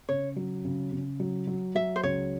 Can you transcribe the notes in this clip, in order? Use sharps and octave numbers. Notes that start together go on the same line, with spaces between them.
C#3 C#5
F#3
C#3
C#3
F#3
F#3
F#3 E5
C5
C#2 C#5